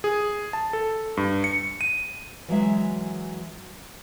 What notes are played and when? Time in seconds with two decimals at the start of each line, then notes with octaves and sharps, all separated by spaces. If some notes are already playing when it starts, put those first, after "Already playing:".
0.04 G#4
0.53 A5
0.73 A4
1.17 G2
1.44 C#7
1.81 D#7
2.48 E3 F#3 G#3 E5